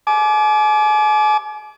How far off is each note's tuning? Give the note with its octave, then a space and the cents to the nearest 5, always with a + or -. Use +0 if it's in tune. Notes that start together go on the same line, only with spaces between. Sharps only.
G#5 +40 D6 +0